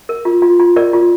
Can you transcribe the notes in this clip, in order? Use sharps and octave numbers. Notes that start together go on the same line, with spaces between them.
A#4
F4
F4
F4
A#4 D5
F4